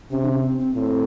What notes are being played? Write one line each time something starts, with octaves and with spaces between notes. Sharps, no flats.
C3 C#4
D4
C#4
C4
C4
A2 C4